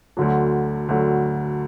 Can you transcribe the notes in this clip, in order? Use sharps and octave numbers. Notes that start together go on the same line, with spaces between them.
D2 D3 F#3
D2 D3 F#3